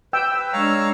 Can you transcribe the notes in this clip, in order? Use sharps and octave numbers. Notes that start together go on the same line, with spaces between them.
B4 G5 E6
G#3 D4 C#5 F5 A#5